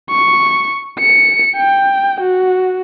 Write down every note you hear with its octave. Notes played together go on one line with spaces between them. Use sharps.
C#6
C#7
G5
F#4